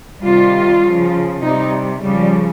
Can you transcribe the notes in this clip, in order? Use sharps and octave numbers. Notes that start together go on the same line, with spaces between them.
C3 D#3 G3 F4
C#3 F3
C3 G3 D#4
C#3 F3 G3